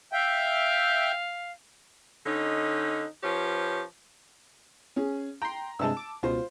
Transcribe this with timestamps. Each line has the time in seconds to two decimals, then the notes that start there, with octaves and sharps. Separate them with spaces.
0.12 E5 F5 G5
2.26 D3 C#4 D#4
3.23 F3 C#4 G4 B4 C#5
4.96 C#4 G#4
5.42 G5 A#5 C6
5.79 G2 C3 G#3 A5 E6
5.97 D6
6.23 C#2 B2 F4 C5